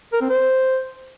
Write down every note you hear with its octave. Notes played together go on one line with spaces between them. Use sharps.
A#4
C4
C5